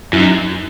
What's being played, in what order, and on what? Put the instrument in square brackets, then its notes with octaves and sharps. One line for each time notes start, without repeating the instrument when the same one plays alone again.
[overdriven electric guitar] F#2 [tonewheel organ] E4
[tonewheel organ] D#4